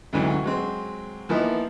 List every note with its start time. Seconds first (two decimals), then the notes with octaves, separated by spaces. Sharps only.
0.13 D2 G#2 C3 E3 F#3 C#4
0.44 F#3 G#3 C4
1.29 E3 F3 A#3 B3 D#4 E4